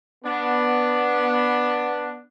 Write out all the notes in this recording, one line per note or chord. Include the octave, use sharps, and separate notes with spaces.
B3 D4